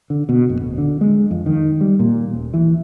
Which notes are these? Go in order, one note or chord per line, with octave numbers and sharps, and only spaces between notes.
D3
B2
F#1
D1
D3
G#3
F2
D#3
G3
A#2
D#1
E3